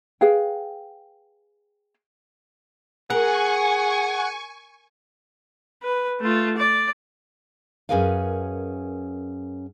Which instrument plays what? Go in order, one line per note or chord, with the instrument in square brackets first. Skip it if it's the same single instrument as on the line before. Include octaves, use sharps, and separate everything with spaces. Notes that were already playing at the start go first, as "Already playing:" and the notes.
[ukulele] G#4 B4 F5 G5
[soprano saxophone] G#4 [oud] A#4 [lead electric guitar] F#5 [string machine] G#5 C#6
[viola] B4
A3 F4
D5
[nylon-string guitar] F#2 C#4 G#4 A#4 B4 F5